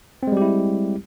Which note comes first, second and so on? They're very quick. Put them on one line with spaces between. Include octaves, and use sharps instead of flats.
C4 G#3 G3 G4 E4